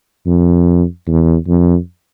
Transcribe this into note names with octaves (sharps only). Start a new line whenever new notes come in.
F2
E2
F2